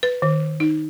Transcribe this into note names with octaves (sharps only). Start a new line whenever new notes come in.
B4
D#3
D#4